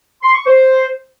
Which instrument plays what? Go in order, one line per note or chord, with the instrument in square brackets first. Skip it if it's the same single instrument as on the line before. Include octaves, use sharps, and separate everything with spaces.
[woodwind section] C6
C#6
C5